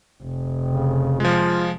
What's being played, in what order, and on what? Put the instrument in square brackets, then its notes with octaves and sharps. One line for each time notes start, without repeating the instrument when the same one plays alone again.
[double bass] F1
[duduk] C#3
[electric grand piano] F3 G#3 [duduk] F4